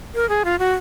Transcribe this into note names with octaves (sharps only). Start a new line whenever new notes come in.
A#4
G#4
F4
F#4